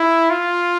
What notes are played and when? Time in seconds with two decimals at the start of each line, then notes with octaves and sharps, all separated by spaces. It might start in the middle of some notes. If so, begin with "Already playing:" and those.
Already playing: E4
0.30 F4